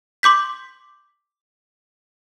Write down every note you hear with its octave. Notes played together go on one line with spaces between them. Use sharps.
C6 D6 G6 B6